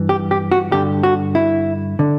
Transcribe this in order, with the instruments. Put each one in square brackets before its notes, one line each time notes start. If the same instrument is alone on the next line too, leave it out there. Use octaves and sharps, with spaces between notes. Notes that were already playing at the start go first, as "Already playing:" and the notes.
Already playing: [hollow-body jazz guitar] G2 E3
G4
G4
F#4
G2 D3 G4
F#4
E4
D3